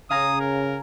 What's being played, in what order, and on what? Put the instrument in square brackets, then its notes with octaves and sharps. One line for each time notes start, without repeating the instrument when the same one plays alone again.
[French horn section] C#3 [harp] F5 G#5 A#5 [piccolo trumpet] D#6
[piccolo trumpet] A#4